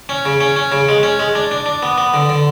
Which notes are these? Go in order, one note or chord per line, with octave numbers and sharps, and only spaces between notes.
C#4
C#3
C#4
C#4
C#3
G#3
C#4
G#3
D4
D4
D4
B3
B3
D3
D3